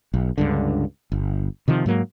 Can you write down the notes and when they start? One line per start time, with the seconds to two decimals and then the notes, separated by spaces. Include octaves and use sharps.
0.14 B1
0.38 C#2 G2 D3
1.12 G1
1.68 C3 D#3 F3
1.86 G#2 F#3 A#3